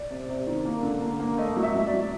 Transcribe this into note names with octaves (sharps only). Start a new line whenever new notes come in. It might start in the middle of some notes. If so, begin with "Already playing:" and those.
Already playing: D5
C3
C3
D#3
A#3
D3
A#3
A#3
A3 D#5
F#3
E5
F#3
D5
F#3